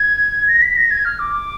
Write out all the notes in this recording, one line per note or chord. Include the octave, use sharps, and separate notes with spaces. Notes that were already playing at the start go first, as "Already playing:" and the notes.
Already playing: G#6
A#6
B6
A#6
G#6
F6
D6